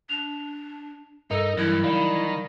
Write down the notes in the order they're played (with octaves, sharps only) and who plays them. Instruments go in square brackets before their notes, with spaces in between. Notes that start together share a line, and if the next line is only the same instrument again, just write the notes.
[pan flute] D4 [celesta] F7
[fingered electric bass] G2 [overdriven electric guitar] D#4 [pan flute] A4 [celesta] A#4
[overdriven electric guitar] G2 [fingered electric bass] E3 F#3 G3 [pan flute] E4
[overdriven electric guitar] D#3 [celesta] D5 F5 B5